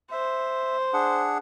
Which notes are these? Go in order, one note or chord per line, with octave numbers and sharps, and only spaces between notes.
C5 E5
D4 G#4 F#5